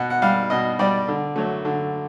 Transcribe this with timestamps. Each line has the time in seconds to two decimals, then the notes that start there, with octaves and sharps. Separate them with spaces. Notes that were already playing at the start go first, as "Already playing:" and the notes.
Already playing: B2 F#5
0.10 F#5
0.22 G3 F5
0.50 B2 D#5
0.79 G3 D5
1.08 D3
1.36 F#3 A3
1.65 D3